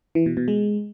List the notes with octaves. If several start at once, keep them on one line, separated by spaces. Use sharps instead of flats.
E3
B2
B2
G#3